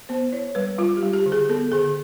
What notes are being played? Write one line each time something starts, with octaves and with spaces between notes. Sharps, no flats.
B3 C5
E4 C#5
G3 B4
G3 F4
G4
G3
G4
D3
G#4
B3 A4
D3 G#4